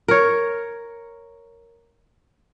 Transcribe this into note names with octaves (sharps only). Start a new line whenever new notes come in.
A#4 C#5